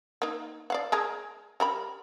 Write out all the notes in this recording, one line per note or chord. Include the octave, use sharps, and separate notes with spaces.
A#3 D#4
D5 F5 F#5
G#3 G#4 A#4
G3 A#4 B5